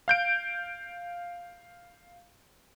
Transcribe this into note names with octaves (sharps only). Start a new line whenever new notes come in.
F5 G6 D7